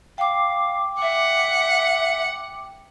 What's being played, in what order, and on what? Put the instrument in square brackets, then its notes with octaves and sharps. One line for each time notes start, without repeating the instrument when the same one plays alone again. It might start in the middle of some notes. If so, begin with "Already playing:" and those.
[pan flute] F5 [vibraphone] G5 D6
[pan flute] E5 [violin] F#5